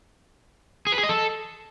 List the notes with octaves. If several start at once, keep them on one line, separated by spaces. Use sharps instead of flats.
G#4
B4
G#4
D#5
A4